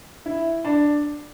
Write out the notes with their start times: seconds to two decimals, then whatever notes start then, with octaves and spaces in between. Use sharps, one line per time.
0.26 E4
0.65 D4